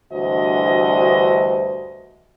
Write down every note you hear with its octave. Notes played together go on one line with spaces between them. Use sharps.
D2 G2 E3 F#4 C5 D#5